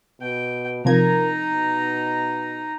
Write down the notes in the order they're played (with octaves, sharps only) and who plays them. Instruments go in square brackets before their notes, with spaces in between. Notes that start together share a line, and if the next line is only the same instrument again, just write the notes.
[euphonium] B2 [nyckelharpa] G5
[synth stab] C3 F3 G#6 [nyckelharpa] D#4 A#5 [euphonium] A#4
[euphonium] B2